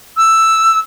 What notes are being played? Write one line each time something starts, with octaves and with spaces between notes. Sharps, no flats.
E6